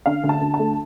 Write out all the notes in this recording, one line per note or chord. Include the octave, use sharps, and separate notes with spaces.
D3 F5
D2
A5
D2
A5
A3